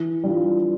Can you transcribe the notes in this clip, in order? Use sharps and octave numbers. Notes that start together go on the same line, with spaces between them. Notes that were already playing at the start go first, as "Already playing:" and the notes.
Already playing: E3
G3 D4 F4